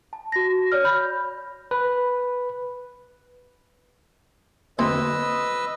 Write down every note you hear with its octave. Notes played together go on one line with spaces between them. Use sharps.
A5
F#4 A#6
C#5 D5 F6
B5 G6
B4
D2 C4 B4 D#5 E6